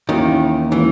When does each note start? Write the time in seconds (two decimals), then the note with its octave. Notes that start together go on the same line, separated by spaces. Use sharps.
0.09 D#2 D#3 E3 A#3 C#4 E4
0.71 D#3 E3 G#3 C#4 E4